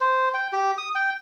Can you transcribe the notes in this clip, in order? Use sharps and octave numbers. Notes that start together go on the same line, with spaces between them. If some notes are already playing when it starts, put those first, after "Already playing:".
C5
G5
G4
D#6
G5